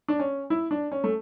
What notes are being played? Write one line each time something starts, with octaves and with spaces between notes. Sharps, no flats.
D4
C#4
E4
D4
C#4
A3